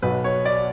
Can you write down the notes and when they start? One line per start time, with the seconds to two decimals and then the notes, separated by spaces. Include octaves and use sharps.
0.02 B1 B2 F#3 B4
0.24 C#5
0.45 D5